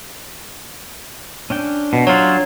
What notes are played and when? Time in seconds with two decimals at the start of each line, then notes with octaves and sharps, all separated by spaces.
1.50 C#4 D4 G5
1.93 B2
2.07 F#3 F4 C#5